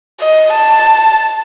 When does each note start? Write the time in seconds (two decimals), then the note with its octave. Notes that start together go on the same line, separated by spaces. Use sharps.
0.21 D#5
0.53 A5